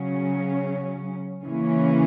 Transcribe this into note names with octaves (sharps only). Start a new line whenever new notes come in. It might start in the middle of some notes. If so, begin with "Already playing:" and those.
Already playing: C#3 F#3 C#4
C#3 E3 A#3 C#4